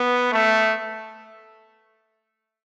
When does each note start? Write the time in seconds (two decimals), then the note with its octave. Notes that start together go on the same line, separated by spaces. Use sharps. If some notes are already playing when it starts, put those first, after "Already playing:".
Already playing: B3
0.32 A3